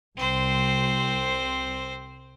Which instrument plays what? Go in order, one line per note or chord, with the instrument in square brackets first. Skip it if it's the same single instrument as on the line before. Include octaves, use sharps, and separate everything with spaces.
[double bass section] C2 [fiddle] C4 C5